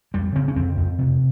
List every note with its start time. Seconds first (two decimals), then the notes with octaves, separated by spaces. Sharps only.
0.14 F2 G3
0.35 C#3 C4
0.48 C#4
0.56 F2 C4
0.77 F2
0.99 C3